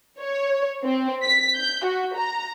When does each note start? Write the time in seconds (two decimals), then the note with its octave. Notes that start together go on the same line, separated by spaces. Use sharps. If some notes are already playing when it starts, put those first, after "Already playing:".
0.19 C#5
0.84 C4
1.23 B6
1.56 G6
1.85 F#4
2.16 A#5